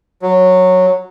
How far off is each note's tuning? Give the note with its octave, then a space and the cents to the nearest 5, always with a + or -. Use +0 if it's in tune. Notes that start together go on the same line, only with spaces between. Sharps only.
F#3 -10